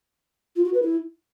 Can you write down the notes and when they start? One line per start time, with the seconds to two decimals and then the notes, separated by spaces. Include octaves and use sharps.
0.56 F4
0.65 F#4
0.74 B4
0.82 E4